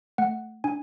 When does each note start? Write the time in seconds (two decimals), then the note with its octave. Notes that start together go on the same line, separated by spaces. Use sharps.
0.18 A3 F#5
0.64 D4 G#5